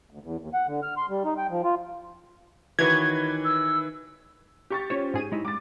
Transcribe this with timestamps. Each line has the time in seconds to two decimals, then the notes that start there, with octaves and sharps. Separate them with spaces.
0.11 D2
0.23 E2
0.40 D#2
0.54 F#5
0.67 D3
0.83 F6
0.97 C6
1.09 G3
1.25 D#4
1.38 G5
1.50 F3
1.64 F4
2.79 D#3 E3 F#4 B4 C#5 B5 G#6
3.45 E6
4.70 G4 C#6 A6
4.90 C#4 F4 C5 C#5
5.14 G#2 G#4 D#7
5.32 G#3 D#4 E4
5.45 G#3 D6 A6